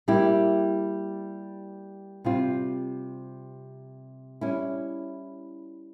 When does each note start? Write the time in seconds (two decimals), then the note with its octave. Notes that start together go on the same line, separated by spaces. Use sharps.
0.08 G3 A#3 E4 G4
2.25 C3 G3 C4 F4
4.41 G3 C#4 E4